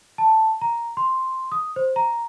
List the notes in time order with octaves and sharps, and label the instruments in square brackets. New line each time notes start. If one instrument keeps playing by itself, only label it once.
[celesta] A5
A#5
C6
D#6
C5
A#5